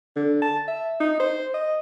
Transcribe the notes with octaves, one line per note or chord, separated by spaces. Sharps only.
D3
A5
E5
D#4
C5
D#5